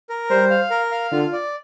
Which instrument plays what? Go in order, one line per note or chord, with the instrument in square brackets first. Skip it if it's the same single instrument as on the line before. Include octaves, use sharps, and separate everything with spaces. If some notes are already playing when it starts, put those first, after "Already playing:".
[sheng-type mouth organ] A#4
[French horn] G3 [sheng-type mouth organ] C5
[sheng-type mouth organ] F5
A#4
F5
[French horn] D3 [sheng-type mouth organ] F4
[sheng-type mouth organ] D5